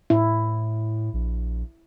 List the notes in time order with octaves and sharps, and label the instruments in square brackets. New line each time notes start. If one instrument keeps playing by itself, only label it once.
[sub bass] A2 [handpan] E4
[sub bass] A#1